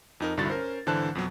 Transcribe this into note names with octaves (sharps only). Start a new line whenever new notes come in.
F2 D#4 A#4
C2 G2 D3 E4 F#4 A6
C#4 A#4 C5
G#1 D3 E3 C5 A5 F#6
F2 B2 F#3